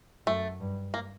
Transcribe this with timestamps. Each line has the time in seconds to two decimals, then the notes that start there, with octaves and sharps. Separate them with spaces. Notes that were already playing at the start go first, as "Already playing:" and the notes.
0.26 F#2 A3
0.60 G2
0.94 A#3